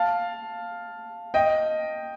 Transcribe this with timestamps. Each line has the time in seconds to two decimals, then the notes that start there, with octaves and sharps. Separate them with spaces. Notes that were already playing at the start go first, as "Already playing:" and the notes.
Already playing: F5 A5
1.34 D#5 G5